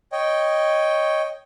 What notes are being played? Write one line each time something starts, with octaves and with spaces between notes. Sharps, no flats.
C#5 D#5 G5